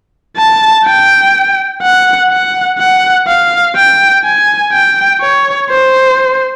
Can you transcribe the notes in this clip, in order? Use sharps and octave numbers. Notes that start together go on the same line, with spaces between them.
A5
G5
F#5
F#5
F#5
F5
G5
G#5
G5
C#5
C5